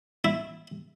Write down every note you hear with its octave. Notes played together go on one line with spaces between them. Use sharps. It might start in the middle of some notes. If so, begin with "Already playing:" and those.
E4